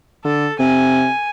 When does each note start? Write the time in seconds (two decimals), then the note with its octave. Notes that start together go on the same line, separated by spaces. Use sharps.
0.25 D3 A4
0.59 C3 G#5